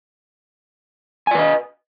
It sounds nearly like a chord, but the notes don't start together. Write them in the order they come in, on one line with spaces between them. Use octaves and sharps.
G#5 D5 B4 D#5